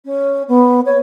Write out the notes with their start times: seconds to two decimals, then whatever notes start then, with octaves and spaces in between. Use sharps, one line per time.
0.05 C#4
0.48 B3
0.85 C#5